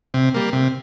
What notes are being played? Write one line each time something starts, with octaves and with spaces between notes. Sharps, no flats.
C3
G3 A#3
C3